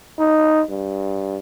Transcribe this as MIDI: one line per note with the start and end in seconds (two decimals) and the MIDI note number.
0.19 0.62 63
0.70 1.38 43